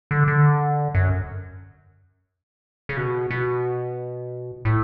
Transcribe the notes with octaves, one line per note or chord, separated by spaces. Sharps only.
D3
D3
F#2
C#3
B2
B2
A2